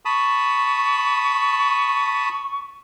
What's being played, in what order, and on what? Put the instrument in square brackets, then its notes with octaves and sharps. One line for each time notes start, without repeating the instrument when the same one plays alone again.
[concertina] A5 B5 D#6 [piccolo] C#6